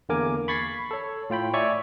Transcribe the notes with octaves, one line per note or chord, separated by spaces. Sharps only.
E2 D3 A#3 A#4 G#5 D6
B5 C#6 G#6 A6 B6 C7
A4 C#5
A2 F4 G5 B5
C#5 D5 E5 G#5 C#6